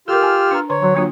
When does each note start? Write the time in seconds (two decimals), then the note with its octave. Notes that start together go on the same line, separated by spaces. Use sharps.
0.08 F4 G4 A4 A#4 E6 F6
0.22 G#5
0.51 D4 B4 A#5
0.70 D3 B4 C#5 A#5
0.83 D3 F#3
0.96 F#3 A#3 D4 F4